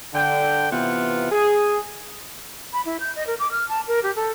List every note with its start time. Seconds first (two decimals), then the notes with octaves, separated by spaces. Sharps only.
0.14 D3 G5
0.71 C3 E3 B3 F4
1.31 G#4
2.73 B5
2.85 E4
3.00 G6
3.15 D#5
3.27 A#4
3.39 D6
3.51 F6
3.69 A5
3.88 A#4
4.03 G4
4.16 A4